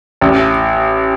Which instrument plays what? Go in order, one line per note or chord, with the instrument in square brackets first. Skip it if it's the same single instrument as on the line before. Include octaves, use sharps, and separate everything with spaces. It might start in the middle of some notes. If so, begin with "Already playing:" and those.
[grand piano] A1